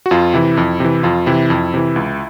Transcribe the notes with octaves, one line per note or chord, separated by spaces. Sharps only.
F#4
F2 F4
C3 E3 E4
F2
C3 E3
F2 F4
C3 E3 E4
F2
C3 E3
C#2